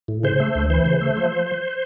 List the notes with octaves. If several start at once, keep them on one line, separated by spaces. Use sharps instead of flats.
A2
C#3 C5
A3
D2
E3 C5
C#3
A3
F3